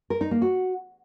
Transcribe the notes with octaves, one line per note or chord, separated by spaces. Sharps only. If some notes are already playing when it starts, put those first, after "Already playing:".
A#4
D#4
A#3
F#4